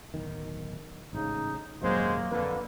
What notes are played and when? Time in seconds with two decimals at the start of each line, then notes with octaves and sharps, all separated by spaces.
0.14 D1 B1 D#3
1.13 A1 G#2 C#3 D#4
1.82 D#1 F#2 C3 F#3 G#3 A#3 C5
2.31 F2 A#2 D3 B4